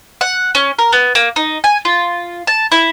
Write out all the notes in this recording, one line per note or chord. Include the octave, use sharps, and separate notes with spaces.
F#5
C#4
A#4
B3
A#3
D#4
G#5
F4
A5
E4